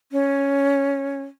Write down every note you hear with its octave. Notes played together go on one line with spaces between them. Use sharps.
C#4